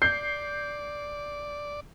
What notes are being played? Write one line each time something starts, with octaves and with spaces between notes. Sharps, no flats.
D5 G6 C7